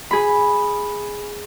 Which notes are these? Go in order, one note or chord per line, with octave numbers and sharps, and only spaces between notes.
G#4 B5